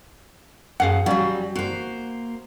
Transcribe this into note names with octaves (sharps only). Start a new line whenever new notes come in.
F#2 G#4 F5 F#5
F#3 G3 C#4 F#4 F5
A#3 F#4 C5